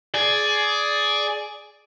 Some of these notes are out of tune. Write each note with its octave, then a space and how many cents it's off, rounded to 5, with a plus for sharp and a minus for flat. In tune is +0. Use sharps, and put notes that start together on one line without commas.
G#4 +15 D5 +0